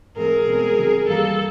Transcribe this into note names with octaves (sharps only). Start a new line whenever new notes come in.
G#2 E3 A3 C4 G#4 A#4
B2 G#3 C4
C3 D#3 F#3
G2 E3 G3 A#3 A4